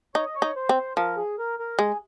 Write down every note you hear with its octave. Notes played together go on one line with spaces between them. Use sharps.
D#4 C#5
D#5
C#5
D#4
C5
C4
F3 A#4
G#4
A#4
A#4
G#3 G#4